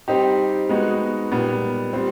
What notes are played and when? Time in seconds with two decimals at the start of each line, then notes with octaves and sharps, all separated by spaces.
0.08 G3 C4 D#4 G4
0.69 G#3 B3 D#4 F#4
1.32 A#2 G3 B3
1.93 G3 C4